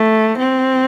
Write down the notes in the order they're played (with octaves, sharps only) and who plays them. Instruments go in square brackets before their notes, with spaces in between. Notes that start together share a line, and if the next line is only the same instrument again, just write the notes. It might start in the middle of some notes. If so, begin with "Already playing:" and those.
Already playing: [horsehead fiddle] A3
C4